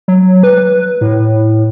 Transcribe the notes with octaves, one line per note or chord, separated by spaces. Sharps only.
F#3
B4
A2